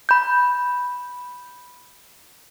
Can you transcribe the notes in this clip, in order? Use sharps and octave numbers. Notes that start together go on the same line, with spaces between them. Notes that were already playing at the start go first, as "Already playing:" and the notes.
B5 G6